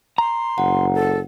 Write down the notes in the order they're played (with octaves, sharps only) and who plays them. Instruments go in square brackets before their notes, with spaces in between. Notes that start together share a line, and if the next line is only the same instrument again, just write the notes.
[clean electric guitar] A#5 [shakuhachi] C6
[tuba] F#1 [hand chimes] F#5
[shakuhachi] A4